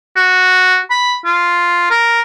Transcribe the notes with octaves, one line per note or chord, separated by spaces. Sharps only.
F#4
B5
F4
A#4